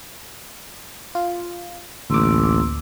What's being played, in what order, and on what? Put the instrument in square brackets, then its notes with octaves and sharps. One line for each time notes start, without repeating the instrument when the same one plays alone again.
[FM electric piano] F4
[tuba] A1 [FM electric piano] D2 D6 [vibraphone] A#3 C6 E6